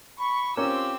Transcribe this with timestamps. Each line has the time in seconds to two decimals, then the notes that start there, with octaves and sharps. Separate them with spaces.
0.20 B5 C#6
0.57 C4 C#4 F4 G4 A#4 E6